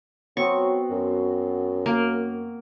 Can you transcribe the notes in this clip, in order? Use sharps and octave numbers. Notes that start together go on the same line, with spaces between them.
F#3 B3 C4 F#4 C#6
F#2
A#3